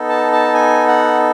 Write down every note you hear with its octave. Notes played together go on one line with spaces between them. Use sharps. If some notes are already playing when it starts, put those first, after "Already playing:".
Already playing: B3 D#4 A4
A5
A5
G#5
F#5